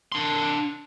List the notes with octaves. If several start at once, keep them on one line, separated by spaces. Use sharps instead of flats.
D4 C6